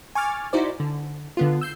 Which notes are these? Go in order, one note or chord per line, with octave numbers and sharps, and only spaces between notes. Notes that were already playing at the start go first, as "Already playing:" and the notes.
G#5 C#6 D6 F6 A6
D#4 E4 F#4 C5 D5
D3
D3 B3 F4
E6 G6 C7